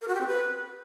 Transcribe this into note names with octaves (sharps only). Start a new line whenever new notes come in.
A#4
F#4
G4
C4
B4